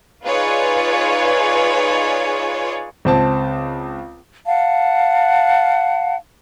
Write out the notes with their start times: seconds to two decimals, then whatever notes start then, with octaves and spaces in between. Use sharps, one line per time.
0.25 D#4 F4 G#4 B4 C#5 D5
3.05 C#2 C4 A5
4.46 F5 F#5 A5